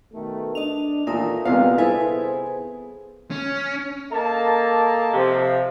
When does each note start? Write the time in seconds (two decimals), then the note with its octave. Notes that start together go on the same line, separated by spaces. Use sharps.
0.13 B2 D#3 A3
0.55 D4 D#5 F7
1.07 D#2 A#2 E3 A3 A#4 D#6
1.45 C2 A#2 E3 G3 G#3 B3 F5
1.78 C2 E4 G#4 A4 B4 C5 G#5
3.31 C#4
4.12 A#3 A4 A#4 D5 D#5 A5
5.14 C3 F3